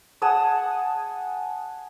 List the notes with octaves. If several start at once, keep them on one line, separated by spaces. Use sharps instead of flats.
G#4 F#5 A5 D#6